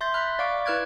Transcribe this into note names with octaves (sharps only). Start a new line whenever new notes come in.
E5 C6 G6 A6
B5 F6 F#6 B6
D5 F5 C#6 D6 D7
E4 B4 F6 F#6 G#6 D7